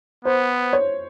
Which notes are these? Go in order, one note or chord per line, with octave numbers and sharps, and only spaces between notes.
B3 C5
C#5